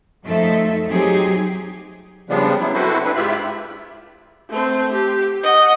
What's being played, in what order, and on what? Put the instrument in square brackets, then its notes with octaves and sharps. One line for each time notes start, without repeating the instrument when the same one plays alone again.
[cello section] F#2 F3 A3 D#4 A4 E5
F#3 C4 D#4 G4 G#4
[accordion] C#3 F3 G3 G#3 B3 D4
F#3 B3 E4
C4 E4 F#4 A4 B4 C5
D4 E4 B4
G#2 E4 F4 G4 E5 B5
[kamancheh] A3 C4
G4
D#5 F#5